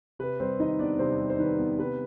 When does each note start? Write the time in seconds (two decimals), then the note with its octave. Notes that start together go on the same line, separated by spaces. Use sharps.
0.19 C3 B4
0.40 G3 C4 C5
0.60 D#3 D#4 D#5
0.79 B3 D4 D5
0.99 C3 C4 C5
1.20 G3
1.30 C5
1.39 D#3 B4
1.59 B3
1.78 C3 B4